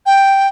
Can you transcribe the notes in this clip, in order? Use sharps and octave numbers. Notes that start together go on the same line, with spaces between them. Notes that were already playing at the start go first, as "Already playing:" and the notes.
G5